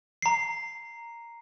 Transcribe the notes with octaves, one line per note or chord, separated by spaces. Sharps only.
A#5 C7